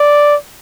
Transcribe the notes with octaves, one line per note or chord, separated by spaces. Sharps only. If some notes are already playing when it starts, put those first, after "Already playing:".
Already playing: D5